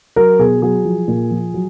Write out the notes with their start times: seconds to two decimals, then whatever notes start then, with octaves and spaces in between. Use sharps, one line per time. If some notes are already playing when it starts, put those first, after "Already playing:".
0.16 F#3 A#4
0.39 B2 G#4
0.62 F#3 G#4
0.85 F3
1.08 A#2
1.31 F3
1.54 F#3